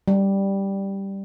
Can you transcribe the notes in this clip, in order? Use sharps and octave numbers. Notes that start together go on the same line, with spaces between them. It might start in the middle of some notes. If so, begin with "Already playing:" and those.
G3